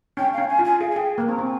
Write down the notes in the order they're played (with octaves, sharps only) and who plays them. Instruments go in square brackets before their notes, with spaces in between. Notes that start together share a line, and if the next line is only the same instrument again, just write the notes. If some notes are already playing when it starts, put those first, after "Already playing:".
[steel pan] C#4 [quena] G5
[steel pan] C#4 [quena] F5
[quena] G#5
[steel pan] F4
[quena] G#5
[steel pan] G#4 [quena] F5
[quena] G#5
[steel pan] G#4 [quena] G5
[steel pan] A#3
[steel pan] C4 [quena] A#5
[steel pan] C4
[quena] G#5